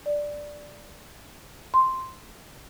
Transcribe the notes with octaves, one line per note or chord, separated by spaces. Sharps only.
D5
C6